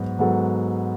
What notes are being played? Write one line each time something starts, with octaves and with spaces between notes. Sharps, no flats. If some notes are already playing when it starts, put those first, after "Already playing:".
Already playing: G#2 F#3 B3 F#4
G#2 F#3 B3 F#4 A4